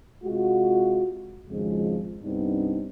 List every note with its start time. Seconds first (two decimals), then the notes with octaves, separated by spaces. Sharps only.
0.24 C3 G#3 F4 F#4
1.49 G#1 F2 C#3 F3 G#3
2.23 C2 G2 B3 C4 D4 D#4